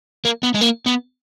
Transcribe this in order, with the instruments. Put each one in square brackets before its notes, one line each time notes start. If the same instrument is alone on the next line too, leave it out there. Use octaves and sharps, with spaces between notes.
[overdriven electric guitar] A#3
B3
G#3
A#3
B3